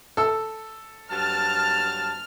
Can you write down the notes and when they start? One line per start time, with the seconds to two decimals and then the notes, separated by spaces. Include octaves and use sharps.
0.17 A4 E6
1.11 G2 F#3 A5 F6